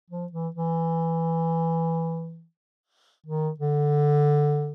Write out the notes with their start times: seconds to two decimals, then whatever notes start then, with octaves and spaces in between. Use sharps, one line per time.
0.10 F3
0.32 E3
0.55 E3
3.26 D#3
3.60 D3